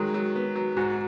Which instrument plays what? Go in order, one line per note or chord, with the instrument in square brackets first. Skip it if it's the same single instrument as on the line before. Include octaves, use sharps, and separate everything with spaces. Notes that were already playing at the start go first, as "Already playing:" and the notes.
Already playing: [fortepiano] D#3 F#3 [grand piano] G#3
[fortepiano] F#3
B3
F#3
[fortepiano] G#2 [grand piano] F#4